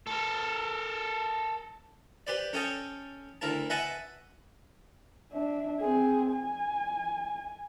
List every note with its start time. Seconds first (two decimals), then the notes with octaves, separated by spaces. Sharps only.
0.07 A4 A#4
2.27 G4 B4 C5 D5
2.53 C#4 A4 C#5 D#5 G5 A5
3.41 D2 E4 A#4 A5
3.70 B4 D#5 E5 F#5 G#5 A5
5.32 D4 E5
5.81 C4 G#4
6.33 G#5